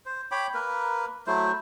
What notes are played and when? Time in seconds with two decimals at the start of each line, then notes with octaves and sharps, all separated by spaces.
0.06 C5
0.31 C#5 G5 B5 D6
0.54 A#3 A#4 B4
1.27 F#3 A3 E4 C5